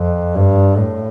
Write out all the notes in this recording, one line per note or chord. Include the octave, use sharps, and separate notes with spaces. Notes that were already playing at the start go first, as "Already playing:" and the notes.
Already playing: F2
G2
A2